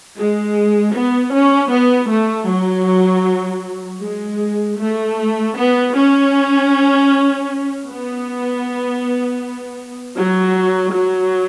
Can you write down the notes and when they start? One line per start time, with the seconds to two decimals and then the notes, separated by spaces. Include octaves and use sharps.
0.18 G#3
0.94 B3
1.33 C#4
1.71 B3
2.10 A3
2.48 F#3
4.02 G#3
4.79 A3
5.56 B3
5.95 C#4
7.87 B3
10.17 F#3
10.94 F#3